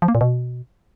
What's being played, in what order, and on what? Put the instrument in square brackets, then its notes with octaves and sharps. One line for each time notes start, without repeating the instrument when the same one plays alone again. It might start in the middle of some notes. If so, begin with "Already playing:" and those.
[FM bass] F3
A#3
A#2
B2